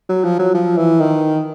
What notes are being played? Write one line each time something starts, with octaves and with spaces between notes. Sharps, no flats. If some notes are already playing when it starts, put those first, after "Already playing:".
F#3
F3
F#3
F3
E3
D#3